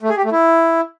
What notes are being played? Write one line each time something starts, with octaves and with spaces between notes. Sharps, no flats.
A3
G#4
G4
A3
E4